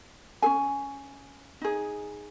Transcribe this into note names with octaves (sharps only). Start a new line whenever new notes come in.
C#4 G#4 G#5
D#4 G#4